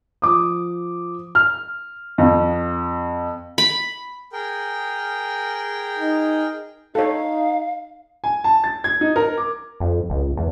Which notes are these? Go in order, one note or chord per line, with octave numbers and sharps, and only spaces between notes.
F3 D6 D#6
F6
F2
B5
G#4 A#4 G5
D#4
D#4 A4 C#5 F5
G#5
A5
A6
G#6
D#4
A#4
D6
F2
C#2
E2